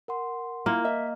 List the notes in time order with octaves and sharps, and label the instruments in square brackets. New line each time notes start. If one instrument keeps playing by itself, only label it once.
[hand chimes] A#4 F#5 C6
[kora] A#3 [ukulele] E4 F4
[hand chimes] D#5 [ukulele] E5